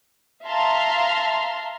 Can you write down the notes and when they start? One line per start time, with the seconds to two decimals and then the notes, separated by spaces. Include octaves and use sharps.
0.44 E5 F5 A5 A#5 C6 F6